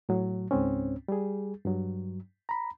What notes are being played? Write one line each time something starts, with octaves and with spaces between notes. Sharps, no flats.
A2 F#3
C#2 G#2 C4 C#4
G3 G#4
G2 F#3
A#5 B5